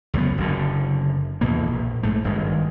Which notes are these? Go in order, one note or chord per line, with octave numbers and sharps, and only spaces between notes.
C#2 F#2 F3 B3
F#1 F#2 D3
E2 B2 A#3
A#1
G#2 A3
G#1 G2 D#3 G#3